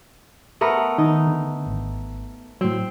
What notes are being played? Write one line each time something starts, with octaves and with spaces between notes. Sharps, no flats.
A3 B3 A#4
D#3 D#4
D3
G#1
A2 F#3 C4